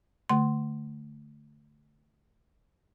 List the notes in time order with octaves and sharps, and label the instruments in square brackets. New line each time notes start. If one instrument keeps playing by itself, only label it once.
[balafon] D3 A3 C6